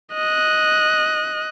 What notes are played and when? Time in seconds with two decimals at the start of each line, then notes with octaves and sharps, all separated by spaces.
0.14 D#5 F#6